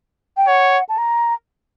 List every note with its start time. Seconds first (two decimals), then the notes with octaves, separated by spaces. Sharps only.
0.37 G5
0.47 C#5 F#5
0.89 A5
0.98 A#5